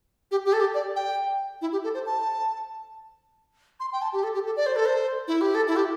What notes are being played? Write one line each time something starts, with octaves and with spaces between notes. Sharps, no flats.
G4
G4
A4
G4
D5
G5
E4
G4
A4
C5
A5
C6
G5
A5
G4
A4
G4
A4
D5
C5
A4
C5
E4
G4
A4
E4
G4